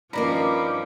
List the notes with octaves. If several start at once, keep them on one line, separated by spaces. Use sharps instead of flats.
G2 D#3 F3 A#3 C#4 A#5 B5 D6